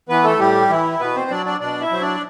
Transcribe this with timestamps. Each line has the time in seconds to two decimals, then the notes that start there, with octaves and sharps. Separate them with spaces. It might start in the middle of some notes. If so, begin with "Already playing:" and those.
0.09 E3 B3 B4
0.24 A3 A4
0.39 A2 G3 G4
0.70 E3 E4
1.00 B2 B3 B4
1.16 C4 C5
1.30 F#3 D4 D5
1.46 D4 D5
1.61 B2 D4 D5
1.81 E4 E5
1.91 F#3 C5
2.01 D4 D5